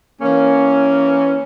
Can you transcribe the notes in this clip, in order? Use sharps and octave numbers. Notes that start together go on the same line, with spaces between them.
E3 A#3 C#4